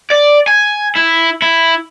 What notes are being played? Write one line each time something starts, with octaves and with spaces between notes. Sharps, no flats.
D5
G#5
E4
E4